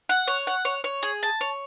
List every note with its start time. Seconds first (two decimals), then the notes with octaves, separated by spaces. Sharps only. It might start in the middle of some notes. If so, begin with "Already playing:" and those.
0.09 F#5
0.27 C#5
0.47 F#5
0.65 C#5
0.84 C#5
1.03 G#4
1.23 A5
1.41 C#5